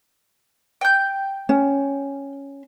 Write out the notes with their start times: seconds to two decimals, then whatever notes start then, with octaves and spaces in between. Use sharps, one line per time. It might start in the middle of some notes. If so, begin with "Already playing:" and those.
0.81 G5 G6
1.49 C#4